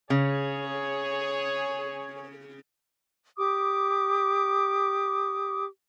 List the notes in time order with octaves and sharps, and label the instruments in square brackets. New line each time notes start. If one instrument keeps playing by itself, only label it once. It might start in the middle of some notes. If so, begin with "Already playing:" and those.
[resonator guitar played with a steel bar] C#3 [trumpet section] G#4 C#5
[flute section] G4 D6 D#6